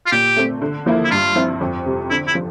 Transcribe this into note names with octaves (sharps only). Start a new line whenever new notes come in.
F4
A#2 G4
A3 C4
D3
F3 A#3 E4
E4
G2 F4
F3 C4 E4
F2
C3 G3
D3 E4
E4
F3